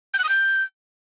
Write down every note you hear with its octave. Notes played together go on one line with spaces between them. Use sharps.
G6
F#6
D#6
G6